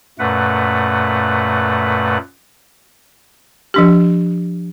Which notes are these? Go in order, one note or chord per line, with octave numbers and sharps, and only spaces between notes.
F#2 A#2 A3 B4 F#5
F3 D4 G4